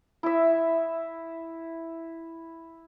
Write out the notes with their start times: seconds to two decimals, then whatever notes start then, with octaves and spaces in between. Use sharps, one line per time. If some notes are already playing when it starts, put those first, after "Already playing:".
0.23 E4 E5